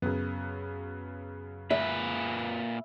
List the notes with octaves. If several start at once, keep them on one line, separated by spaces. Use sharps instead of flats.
F#2 C#3 F#3 B3
A#2 B4 E5